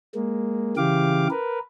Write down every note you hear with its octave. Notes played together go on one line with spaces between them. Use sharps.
G#3 A#3
C#3 E3 G4 F5 D6
A#4 B4